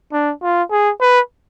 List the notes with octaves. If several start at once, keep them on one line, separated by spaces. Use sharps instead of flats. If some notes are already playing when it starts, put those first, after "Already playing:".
D4
F4
G#4
B4